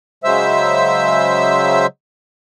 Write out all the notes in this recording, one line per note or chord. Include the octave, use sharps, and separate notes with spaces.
C#3 F#3 G#3 C5 E5 E6